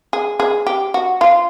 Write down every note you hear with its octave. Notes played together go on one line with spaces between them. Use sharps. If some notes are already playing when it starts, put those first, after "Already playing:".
G#4
G#4
G4
F#4
F4